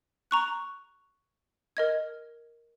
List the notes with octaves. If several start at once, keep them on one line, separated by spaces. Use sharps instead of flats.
A#5 C#6 F#6
A#4 D#5 G#6